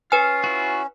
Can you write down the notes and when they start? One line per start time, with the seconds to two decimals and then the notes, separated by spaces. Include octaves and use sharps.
0.12 C#4 F4 B4 G#5 F6
0.44 E4 F#4